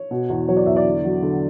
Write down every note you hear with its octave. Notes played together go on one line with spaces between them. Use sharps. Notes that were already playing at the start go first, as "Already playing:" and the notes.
Already playing: C#5
B2
E2
F#3 C#5
D5
E2 E5
D5
D3
F#3
D3